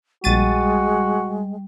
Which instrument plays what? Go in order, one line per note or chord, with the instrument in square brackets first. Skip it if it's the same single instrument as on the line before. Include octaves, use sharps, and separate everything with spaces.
[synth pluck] A#1 A6 D#7 [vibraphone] G3 [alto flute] G#3 [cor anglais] F#4